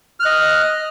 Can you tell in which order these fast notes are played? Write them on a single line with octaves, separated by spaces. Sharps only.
F6 F#6 D#5